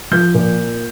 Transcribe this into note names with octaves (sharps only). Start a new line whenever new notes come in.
F3 G6
A#2